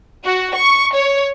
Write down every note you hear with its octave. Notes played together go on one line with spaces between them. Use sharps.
F#4
C#6
C#5